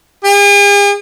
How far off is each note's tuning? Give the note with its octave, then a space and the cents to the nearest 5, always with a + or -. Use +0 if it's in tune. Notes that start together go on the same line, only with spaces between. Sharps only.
G#4 -45